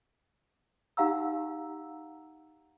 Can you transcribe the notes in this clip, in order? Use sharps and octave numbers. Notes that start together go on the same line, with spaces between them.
D#4 G4 F5 F#5 A#5 E6